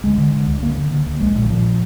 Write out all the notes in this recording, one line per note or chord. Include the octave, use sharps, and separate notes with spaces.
D2 G#3
D3
D3
D2
D2 A#3
D3
D3
D2
A#1 G#3
A#2
D#3
A#2 F3